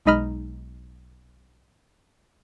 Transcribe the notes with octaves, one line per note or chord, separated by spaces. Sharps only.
B1 G#3 D#4 D#5 B5 F6